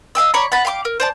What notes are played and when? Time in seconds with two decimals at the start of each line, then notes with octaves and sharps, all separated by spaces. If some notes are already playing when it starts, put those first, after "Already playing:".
0.15 D#5 F5 G5 E6
0.34 C#5 D5 A#5 B5
0.52 F#5 A5 B5
0.65 F5 G5 C6 D6
0.85 A#4
1.00 C5 D5 A5